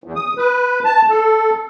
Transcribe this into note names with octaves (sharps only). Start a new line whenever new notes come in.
E2
D#6
B4
A5
A4